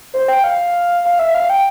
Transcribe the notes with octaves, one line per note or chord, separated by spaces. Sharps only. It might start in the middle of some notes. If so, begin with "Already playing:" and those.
C5
G5
F5
F5
E5
F5
G5